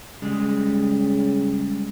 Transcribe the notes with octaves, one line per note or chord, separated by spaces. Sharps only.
C#3 G3 G#3 G#4